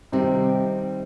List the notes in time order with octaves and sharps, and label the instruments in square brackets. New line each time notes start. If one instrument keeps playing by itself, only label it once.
[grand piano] C3 [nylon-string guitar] D#3 G3 C4 D#4